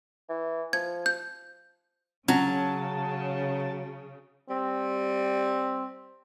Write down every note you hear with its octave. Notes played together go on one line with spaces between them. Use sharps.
E3
F3 G#6
G6
C#3 F#3 C#4 A5
G3 C4